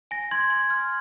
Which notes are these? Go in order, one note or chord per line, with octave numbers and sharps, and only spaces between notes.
G#5 A#6
C6 G#6
C6
F6